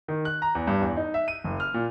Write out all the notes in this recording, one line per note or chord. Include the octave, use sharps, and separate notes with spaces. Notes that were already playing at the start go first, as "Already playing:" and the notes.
D#3
F#6
A#5
E2
G2
E2
D#4
E5
D#7
F#1
F6
A#2